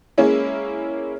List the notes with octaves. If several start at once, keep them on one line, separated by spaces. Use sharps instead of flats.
G#3 A#3 C#4 E4